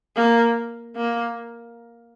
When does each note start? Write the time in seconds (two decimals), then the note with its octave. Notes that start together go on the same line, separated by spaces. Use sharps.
0.16 A#3
0.96 A#3